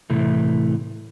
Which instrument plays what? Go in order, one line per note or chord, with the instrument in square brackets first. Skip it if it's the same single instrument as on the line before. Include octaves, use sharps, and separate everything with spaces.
[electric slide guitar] A2 C3 E3 A3